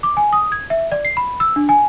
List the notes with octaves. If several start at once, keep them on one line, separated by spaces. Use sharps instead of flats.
D6
G#5
D#6
G#6
E5
D5
C7
B5
E6
D4
G#5